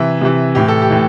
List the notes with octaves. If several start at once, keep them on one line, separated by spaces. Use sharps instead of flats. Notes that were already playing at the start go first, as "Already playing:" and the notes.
Already playing: C3 E3 E5
C3 E3
A2 E3 G4
A4
G4
A2 E3